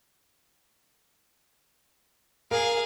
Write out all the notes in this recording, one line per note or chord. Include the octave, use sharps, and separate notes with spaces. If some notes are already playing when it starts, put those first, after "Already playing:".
G#4 A#4 F5